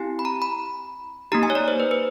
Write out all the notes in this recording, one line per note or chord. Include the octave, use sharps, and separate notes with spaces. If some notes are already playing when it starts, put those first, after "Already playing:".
Already playing: C4 E4 G4 G#5
B5
A#5
B5
A#3 D#4 G4 A#5
G#5
C#5
D5
C5
B4
B4